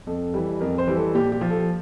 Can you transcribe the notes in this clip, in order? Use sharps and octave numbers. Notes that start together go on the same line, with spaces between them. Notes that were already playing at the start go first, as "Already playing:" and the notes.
F2 A4
E3 G3
F2 A#4
C5
E3 G3
A4
A#2 G4
G4
F3
A4